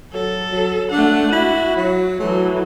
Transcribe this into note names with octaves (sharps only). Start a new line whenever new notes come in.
F#3 A4
F#3
A3 D4 F#5
E4 F#4
F#3
E3 F#3 A3